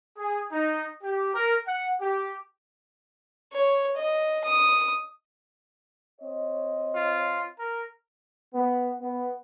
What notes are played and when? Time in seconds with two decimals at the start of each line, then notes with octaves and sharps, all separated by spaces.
0.17 G#4
0.52 D#4
1.03 G4
1.34 A#4
1.67 F#5
2.00 G4
3.53 C#5
3.97 D#5
4.45 D#6
6.21 C4 C#5 D#5
6.95 F4
7.59 A#4
8.54 B3
9.01 B3